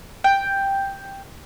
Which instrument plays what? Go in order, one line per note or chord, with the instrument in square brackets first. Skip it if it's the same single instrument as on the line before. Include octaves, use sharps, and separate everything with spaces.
[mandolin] G5